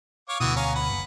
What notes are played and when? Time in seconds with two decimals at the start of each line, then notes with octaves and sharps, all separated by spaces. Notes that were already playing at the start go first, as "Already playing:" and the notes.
0.29 C#5 F5 D6
0.40 D2 B2 E3 F#4 D#6
0.56 C#4 F5 A#5
0.75 B4 F#5
0.90 F#1